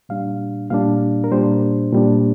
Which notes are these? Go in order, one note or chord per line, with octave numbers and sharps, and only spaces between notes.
A#2 G3 D4 F5
A#2 G3 D4 F5
A#4
A#2 G3 D4 C5
A#2 G3 D4